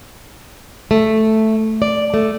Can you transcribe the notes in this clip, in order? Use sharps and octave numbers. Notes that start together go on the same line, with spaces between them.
A3
D5
A3